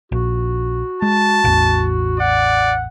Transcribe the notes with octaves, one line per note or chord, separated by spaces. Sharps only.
A#1 F#4
G#3 A5
A1 E2
D5 F#5